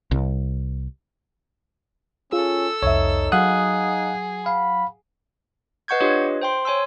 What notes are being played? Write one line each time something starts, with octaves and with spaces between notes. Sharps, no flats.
C2
C#4 F4 G#4 A4 E6
C2 F2 D#4 C#5 E5
F#3 G#4 F5 F#5 D#6 F#6
F5 B5
B4 D#5 F#5 C#6 G6 G#6
D4 F4 G4 B4 C#5 D#5
C5 G5 C6
C#5 G#5 C6 E6